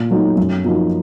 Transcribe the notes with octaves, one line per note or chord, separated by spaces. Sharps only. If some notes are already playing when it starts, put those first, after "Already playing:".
Already playing: A#2
F#3 A3 D#4
F#2
F3 A#3 D#4 F#4